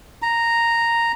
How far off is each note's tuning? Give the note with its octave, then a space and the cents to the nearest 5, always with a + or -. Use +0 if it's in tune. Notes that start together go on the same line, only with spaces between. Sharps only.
A#5 -5